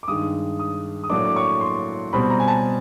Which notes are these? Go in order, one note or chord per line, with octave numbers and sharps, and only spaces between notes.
D6
G2 D#3 G#3 D#6
D#6
D#6
A2 F#3 A#3 D4 D6
D6
C#6
C6
B2 G3 C4 B5
A#5
G#5
A5